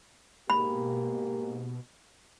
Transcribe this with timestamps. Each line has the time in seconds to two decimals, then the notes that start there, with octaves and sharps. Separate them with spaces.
0.50 G#2 B2 A#3 G4 B5